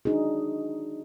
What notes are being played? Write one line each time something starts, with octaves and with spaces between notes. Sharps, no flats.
D4 D#4 F#4 G#4